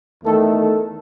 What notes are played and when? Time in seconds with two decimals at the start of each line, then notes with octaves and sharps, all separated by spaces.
0.24 E2 D#3 A3 A4
0.59 A4